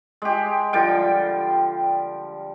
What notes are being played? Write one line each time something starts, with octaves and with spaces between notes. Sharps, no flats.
G#3 G4
D3 F3 G3 G5